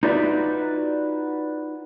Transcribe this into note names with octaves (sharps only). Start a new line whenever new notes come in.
D#4 F4 F#4 B4 D5 E5